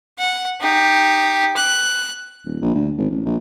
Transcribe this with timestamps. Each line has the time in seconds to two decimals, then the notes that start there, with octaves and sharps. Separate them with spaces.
0.19 F#5
0.61 D#4 G4
1.57 F#6
2.45 D#1
2.61 A#1
2.75 D2
2.98 G#1
3.10 A1
3.25 A#1